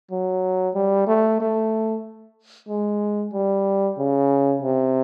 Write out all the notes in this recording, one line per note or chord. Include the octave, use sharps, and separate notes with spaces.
F#3
G3
A3
A3
G#3
G3
C#3
C3